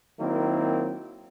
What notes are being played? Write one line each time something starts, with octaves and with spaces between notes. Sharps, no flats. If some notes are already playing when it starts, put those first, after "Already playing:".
D#3 F#3 A#3 C4 E4